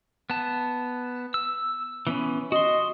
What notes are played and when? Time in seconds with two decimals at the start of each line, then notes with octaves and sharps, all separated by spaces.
0.30 B3 A5
1.34 E6
2.07 E3 B3 C#4
2.52 F#4 D#5 C6